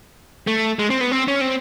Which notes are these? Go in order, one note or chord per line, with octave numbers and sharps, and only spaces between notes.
A3
G#3
C4
B3
C4
C#4
C4